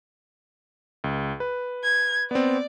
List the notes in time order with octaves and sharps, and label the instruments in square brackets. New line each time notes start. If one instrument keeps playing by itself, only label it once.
[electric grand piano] C#2
B4
[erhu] G#6
[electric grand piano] B3 C4 [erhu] D5